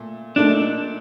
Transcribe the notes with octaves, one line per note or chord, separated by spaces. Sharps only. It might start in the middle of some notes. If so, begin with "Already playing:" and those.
Already playing: A#2 A3
A#2 A3 D4 D#4 A4